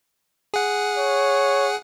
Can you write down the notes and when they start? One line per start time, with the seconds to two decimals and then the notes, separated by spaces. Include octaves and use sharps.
0.54 G#4 F#5
0.98 C#5